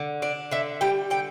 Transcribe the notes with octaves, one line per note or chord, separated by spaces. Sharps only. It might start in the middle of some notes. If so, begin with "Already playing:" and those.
Already playing: D3
D4 D5
D3 E5
G3 G5
D3 G5